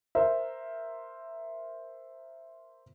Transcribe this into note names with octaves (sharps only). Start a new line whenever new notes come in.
A#4 C5 E5